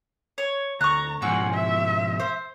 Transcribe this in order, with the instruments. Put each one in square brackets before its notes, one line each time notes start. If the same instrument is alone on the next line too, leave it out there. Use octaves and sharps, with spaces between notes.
[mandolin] C#5
[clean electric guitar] D2 [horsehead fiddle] A#5 [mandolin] C#6 F#6
[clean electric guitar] G#2 B2 F3 [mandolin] F#4 E6 [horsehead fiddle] F#5 G#5
[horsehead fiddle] E5
[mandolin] C5